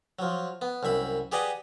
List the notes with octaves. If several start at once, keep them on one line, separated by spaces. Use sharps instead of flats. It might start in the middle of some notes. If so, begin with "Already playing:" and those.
F3 F#3
B3
C2 F#2 E5 B5
G4 G#4 B4 D5 D#5 F#5